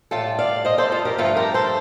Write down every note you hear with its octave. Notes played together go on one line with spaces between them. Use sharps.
A2 G3 F4 A4
D5 F5
C5 D#5
A4 C5
F4 A4
G4 A#4
G2 F3 A3 F4 A4
G4 A#4
A4 C5